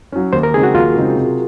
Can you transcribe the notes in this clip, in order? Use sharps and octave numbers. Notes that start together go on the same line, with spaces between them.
F#3 C#4
D#2 C5
A#4
C#3 G#3 C4 D#4 G#4
F#4
D#2 F4
C#3 G#3 C4 D#4
C3